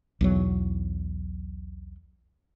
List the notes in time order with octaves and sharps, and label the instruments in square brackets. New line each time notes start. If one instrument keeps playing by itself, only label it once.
[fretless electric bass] B1 E2 F#3